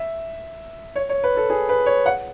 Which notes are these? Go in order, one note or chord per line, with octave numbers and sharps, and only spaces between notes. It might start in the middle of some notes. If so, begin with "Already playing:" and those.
Already playing: E5
C#5
C#5
B4
A4
G#4
B4
C#5
F#5